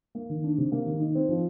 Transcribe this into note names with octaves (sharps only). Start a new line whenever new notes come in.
A#3
D#3
D4
C3
A#3
D#3
D#4
C4
F3